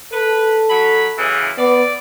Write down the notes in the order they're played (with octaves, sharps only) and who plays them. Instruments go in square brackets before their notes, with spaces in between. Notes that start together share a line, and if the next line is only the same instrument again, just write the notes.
[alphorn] A4 [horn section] B4
[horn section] F#3 B5
F#2 C#3 E3
[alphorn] B3 [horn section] D5